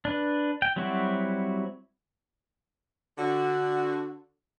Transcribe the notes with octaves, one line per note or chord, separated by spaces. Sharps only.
D4 B4
G5
F#3 G3 C4 E4 F#4
D3 F#4